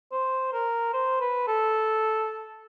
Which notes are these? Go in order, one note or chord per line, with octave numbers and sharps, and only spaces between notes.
C5
A#4
C5
B4
A4